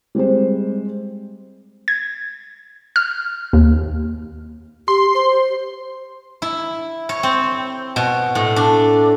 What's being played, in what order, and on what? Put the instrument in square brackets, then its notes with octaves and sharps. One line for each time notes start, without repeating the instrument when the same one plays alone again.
[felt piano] G3 G#3 C4 C5
[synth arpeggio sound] G#6
F6
D#2
[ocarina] G4 [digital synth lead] C6
[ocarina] C5
[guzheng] E4
C#5
C4
B2
A2
D4